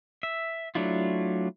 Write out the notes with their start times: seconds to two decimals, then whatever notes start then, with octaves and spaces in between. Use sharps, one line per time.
0.23 E5
0.75 F#3 A3 D4 E4 F4